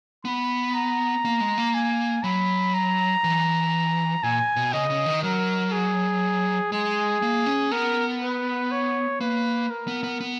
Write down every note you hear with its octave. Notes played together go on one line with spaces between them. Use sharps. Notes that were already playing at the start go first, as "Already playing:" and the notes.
B3 B5
A#5
A#3
G#3
A#3
G#5
F#3 B5
A#5
E3
A#2 G#5
B2
C#3 D#5
C#3
D#3
F#3 A#4
G#4
G#3 G#4
A#3
C#4
B3 A#4
B4
C#5
A#3 B4
A#4
B3
B3
B3